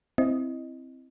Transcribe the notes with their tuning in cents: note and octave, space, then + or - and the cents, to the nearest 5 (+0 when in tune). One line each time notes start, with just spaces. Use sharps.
C4 +0 E4 +0 D#5 +0